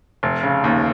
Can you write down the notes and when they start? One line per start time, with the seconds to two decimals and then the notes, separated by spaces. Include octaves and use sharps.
0.23 F1
0.43 C#3
0.64 D#2